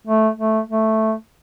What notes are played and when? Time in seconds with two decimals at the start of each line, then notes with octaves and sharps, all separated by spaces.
0.07 A3
0.38 A3
0.70 A3